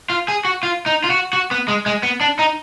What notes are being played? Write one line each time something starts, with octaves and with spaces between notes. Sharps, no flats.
F4
G#4
F#4
F4
D#4
F4
F#4
F#4
B3
G#3
G#3
B3
D4
D#4